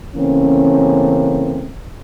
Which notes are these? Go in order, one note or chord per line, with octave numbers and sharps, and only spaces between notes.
C#3 E3 A3 A#3 C4 C#4